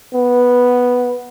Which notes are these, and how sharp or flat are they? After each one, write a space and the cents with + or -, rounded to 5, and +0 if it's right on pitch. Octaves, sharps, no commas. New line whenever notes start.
B3 -5